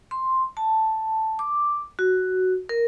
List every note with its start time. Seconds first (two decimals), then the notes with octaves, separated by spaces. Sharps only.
0.11 C6
0.57 A5
1.39 D6
1.99 F#4
2.69 A#4